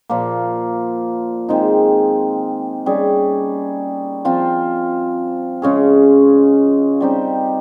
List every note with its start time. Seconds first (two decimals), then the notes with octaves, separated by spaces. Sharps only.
0.10 A#2 F3 A#3
1.49 D#3 G#3 C4 D#4
2.86 G3 C#4 G#4
4.25 F3 C4 F4
5.62 C#3 G#3 C#4 G#4
7.01 G3 C4 D#4 G4